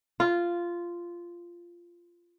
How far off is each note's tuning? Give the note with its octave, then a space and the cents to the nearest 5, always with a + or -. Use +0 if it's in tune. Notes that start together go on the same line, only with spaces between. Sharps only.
F4 -10